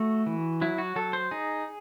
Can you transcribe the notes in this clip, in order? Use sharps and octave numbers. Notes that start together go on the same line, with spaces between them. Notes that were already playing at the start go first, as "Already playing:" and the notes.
Already playing: A3 F#4
E3
F#3 E4
F#4
F#3 A4
C5
D#4 G#4